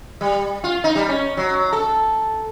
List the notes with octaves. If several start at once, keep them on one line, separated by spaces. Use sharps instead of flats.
G3
F4
D#4
G3
C#4
F#3
A4